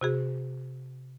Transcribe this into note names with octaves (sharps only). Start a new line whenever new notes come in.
C3 F#4 G#4